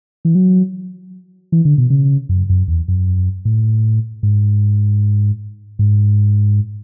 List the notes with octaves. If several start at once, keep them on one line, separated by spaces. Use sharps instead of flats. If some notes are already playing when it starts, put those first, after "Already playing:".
E3
F#3
E3
D3
B2
C#3
F#2
F#2
E2
F#2
A2
G#2
G#2